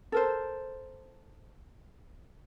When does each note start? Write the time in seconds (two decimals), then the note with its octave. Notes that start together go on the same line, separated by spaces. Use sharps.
0.12 A4 A#4 C5